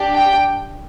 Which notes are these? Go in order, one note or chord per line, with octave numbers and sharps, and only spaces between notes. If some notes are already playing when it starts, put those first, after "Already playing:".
Already playing: D4 G4
G5